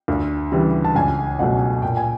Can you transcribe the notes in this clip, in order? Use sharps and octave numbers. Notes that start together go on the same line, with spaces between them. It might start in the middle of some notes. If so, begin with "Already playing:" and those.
D2
C#3 E3 G3
A5
C#2 G#5
B2 F#3 A3 F#5
A#2 G5
G#5